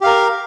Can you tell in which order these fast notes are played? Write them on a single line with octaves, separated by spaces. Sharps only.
G4 F5 A#4